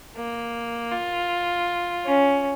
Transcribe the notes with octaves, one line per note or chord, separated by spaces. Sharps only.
A#3
F4
C#4